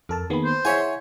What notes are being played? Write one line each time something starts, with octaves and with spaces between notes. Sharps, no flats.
F2 A4 A#4 A5
D#3 A#3 B3 G#4 B5
C5
E4 G#4 C#5 E5 F#5 G#5